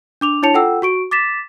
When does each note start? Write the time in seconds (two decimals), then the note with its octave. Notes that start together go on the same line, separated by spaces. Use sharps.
0.21 D4 D6 F7
0.43 D4 E4 C#5 A5 C#7 F7
0.54 F4 A4 F#5 G5 E6
0.82 F#4 C#6 D7
1.11 D6 A6 B6 E7